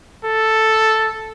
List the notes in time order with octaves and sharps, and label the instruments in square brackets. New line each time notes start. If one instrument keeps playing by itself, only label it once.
[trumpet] A4